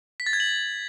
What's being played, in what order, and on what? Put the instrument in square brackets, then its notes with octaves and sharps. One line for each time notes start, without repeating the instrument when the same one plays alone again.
[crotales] B6
A6
G#6
F#7